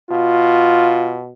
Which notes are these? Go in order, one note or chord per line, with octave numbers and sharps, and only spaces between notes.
B2 F4